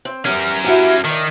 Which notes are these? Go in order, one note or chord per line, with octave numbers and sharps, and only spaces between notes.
C4
E2 G3 C#4 A#4
E4 F#4 G4
A2 D#3 D5